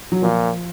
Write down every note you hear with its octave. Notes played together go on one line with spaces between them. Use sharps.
F#3
A#2 F3